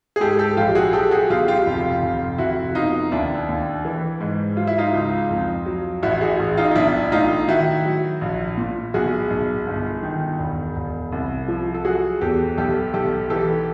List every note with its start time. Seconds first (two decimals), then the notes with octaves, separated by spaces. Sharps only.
0.16 G#4
0.20 G#2 G4 A4
0.39 G4 A4
0.57 A#1 F4 G4
0.75 F#4 G#4
0.93 F#3 G4 A4
1.11 F#4 G#4
1.30 B1 F4 G4
1.48 F4 G4
1.66 F1
2.03 F1
2.38 F1 E4 F#4
2.69 F#4
2.75 B2 D#4 F4
3.11 D#2 D4 E4
3.48 D#2
3.85 E3
4.20 G#2
4.57 F#3 F4
4.67 E4
4.78 D#4 F4
4.94 C#2
5.31 F2
5.66 F#3
6.03 A1 E4 F#4
6.21 F#4 G#4
6.40 A1
6.57 D#4 F4
6.71 D#4
6.75 B1 D4 E4
7.12 A2 D#4 F4
7.48 D#3 E4 F#4
7.85 F#3
8.21 A#1
8.57 A#2
8.94 B1 F#4 G#4
9.30 B1
9.67 G1
10.03 D#3
10.39 E1
10.76 E1
11.12 C2
11.48 F3
11.74 A4
11.85 F#3 F#4 G#4
12.21 E2 G4 A4
12.57 B1 G4 A4
12.93 B1 G4 A4
13.30 E3 G4 A4